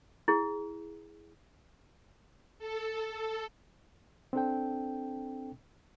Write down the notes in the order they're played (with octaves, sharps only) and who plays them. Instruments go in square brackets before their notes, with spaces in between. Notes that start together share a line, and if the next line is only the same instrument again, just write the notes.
[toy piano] E4 G#4
[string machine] A4
A4
[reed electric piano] C4 D4 A4 G5